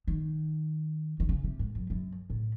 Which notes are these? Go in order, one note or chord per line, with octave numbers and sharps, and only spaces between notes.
D#3
D#3
C#3
C3
G#2
F#2
F#2
A2